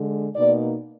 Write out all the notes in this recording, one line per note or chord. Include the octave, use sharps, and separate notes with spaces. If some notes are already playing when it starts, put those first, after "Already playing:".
Already playing: D3 G#3
B2 A#3 D#4 D5